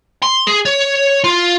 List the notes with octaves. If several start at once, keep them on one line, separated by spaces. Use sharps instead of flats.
C6
G#4
C#5
F4